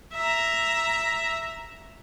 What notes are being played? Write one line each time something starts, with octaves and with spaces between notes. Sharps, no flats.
E5 A#5